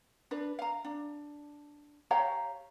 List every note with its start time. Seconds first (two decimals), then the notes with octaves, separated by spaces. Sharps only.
0.31 D4 B4
0.59 F5 A#5
0.85 D4
2.11 G4 C#5 F5 A#5